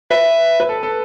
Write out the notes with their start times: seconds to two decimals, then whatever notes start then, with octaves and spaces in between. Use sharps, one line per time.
0.11 B4 E5
0.60 B4
0.69 A4
0.83 A4